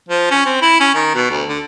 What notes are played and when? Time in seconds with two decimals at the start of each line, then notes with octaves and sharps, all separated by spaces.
0.09 F3
0.31 C#4
0.46 C4
0.62 E4
0.80 C#4
0.95 D#3
1.15 B2
1.30 D2
1.49 D3